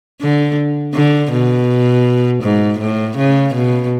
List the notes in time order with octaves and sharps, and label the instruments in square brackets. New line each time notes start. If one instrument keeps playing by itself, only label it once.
[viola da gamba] D3
D3
B2
G#2
A2
C#3
B2